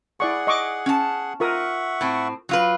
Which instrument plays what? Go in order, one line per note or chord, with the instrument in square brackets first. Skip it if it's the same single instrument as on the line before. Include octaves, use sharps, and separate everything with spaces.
[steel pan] E4 D5 C#6 [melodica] G#4 F#5
[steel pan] D#5 C#6 D6
[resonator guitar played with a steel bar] C#4 A5
[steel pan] F4 A#4 D#6 [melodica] E5 F#5 C#6
[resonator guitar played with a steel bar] A2 C4
F#3 F4 B4